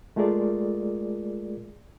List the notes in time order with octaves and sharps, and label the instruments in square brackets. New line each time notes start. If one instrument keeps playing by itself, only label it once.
[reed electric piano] G#3 A3 F4 G#4 A#4 D5